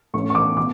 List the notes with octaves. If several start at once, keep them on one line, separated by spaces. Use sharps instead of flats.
A2 F3 A3 C#4 C#6
C#6
D6
B2 D6